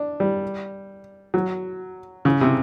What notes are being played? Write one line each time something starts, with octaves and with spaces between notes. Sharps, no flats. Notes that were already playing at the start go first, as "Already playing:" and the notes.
Already playing: D4
G3
F#3
C#3
C3